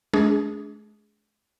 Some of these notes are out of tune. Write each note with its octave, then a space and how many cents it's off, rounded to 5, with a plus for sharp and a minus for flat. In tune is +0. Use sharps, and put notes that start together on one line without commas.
G#3 +45 D4 -35 G#4 +0